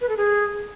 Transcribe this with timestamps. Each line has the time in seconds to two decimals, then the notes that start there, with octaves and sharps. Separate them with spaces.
0.01 B4
0.09 A4
0.17 G#4